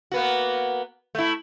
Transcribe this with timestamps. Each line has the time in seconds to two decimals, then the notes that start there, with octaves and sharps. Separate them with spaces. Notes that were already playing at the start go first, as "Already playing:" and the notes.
0.12 A#3 B3 F#4
1.15 A3 E4